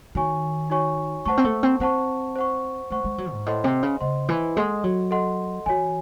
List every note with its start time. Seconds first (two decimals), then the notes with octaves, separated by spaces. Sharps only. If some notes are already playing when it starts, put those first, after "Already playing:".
0.15 D#3 D#4 F#4 C#5 G#5 C#6
0.70 D#4 F#4 C#5 G#5 C#6
1.25 A3 C5 F#5 A5 C#6
1.37 C4
1.45 A3
1.63 C4
1.80 C4 C5 F#5 A5 C#6
2.36 C5 F#5 C#6
2.90 A3 C5 F#5 C#6
3.04 G#3
3.18 F#3
3.32 G#2
3.46 A2 C5 D#5 F#5 C6
3.64 C3
3.83 C#3
4.01 C#3 C5 D#5 F#5 C6
4.29 E3
4.56 G#3 A4 D#5 F#5 C6
4.84 F#3
5.11 A4 D#5 F#5 C6
5.66 E3 F#4 C#5 G#5